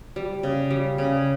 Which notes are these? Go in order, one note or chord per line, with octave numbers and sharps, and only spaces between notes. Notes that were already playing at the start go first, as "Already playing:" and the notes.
G3
C#3
G3
C#3